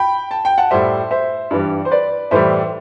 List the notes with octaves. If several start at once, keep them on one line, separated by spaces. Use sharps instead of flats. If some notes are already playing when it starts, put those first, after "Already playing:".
Already playing: G5 B5
A5
G5
F#5 A5
A2 G3 C5 E5
C5 E5
G2 E3 G3
C5
B4 D5
A2 E3 G3 C5 E5